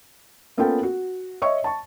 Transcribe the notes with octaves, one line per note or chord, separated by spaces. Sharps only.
A#3 B3 C#4 F4 A4 G5
F#4
C#5 D#5 E5 C#6
A5 C#6